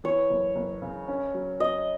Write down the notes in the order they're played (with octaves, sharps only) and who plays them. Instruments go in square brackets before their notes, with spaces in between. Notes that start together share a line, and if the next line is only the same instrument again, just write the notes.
[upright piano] E3 [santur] C#5
[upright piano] F#1
F#1
C#3
C#4
F#3
[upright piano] F#3 [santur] D#5